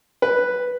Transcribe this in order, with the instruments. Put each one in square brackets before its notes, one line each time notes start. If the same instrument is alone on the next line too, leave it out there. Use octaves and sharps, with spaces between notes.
[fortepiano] B4